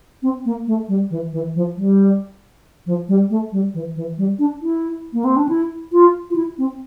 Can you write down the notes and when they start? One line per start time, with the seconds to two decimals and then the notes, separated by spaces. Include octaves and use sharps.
0.23 C4
0.45 A#3
0.67 A3
0.88 G3
1.10 E3
1.32 E3
1.55 F3
1.76 G3
2.86 F3
3.08 G3
3.30 A3
3.52 G3
3.74 E3
3.96 E3
4.18 G3
4.39 D4
4.62 E4
5.13 A#3
5.24 C4
5.37 D4
5.49 E4
5.92 F4
6.30 F4
6.36 E4
6.58 C4